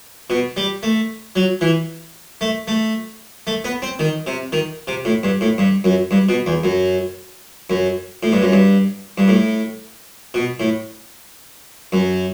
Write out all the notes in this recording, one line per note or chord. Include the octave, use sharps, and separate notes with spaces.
B2
G3
A3
F#3
E3
A3
A3
A3
B3
C4
D#3
C3
D#3
C3
A2
G2
A2
G2
F#2
G2
B2
E2
F#2
F#2
A2
G2
F#2
G2
G2
A2
B2
A2
F#2